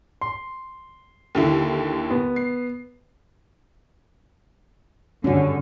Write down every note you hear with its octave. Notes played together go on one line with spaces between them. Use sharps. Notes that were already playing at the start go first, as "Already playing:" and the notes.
C6
D#2 D3 E4
B3
C7
G2 D3 C#4 F#4